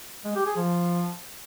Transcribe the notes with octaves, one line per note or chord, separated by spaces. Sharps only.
G#3
G4
G#4
F3